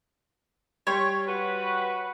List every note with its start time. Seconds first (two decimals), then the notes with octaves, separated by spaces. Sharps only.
0.87 G3 G4 C#5 C6
1.27 F#4 B4